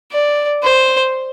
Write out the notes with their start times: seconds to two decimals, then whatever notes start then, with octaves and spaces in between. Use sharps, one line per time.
0.12 D5
0.62 C5